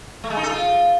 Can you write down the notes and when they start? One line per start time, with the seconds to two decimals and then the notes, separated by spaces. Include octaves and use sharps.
0.24 A3
0.30 G#3
0.37 D#4
0.43 A4
0.50 F4